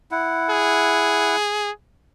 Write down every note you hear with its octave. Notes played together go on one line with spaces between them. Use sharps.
E4 F#5
G#4